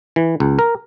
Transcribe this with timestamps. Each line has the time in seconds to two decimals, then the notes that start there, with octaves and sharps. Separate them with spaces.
0.16 E3
0.40 C#2
0.59 A#4